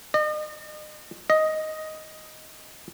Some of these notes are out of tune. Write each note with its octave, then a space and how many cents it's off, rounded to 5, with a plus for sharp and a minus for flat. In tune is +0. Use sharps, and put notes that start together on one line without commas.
D#5 -40
D#5 +5